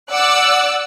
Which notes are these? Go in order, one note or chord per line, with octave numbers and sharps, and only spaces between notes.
D5 F#5 D6 E6 F#6